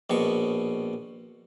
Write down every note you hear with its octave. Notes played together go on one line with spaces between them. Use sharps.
A#1 B2 C#6